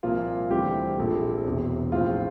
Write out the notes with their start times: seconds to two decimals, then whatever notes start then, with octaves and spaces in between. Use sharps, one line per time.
0.03 C2 A#2 F3 A#3 F4
0.50 D2 C3 E3 G3 C4 G4
0.98 A#1 A#2 A3 C4
1.45 E1 E2 C3
1.92 A#1 A2 F3 C4 F4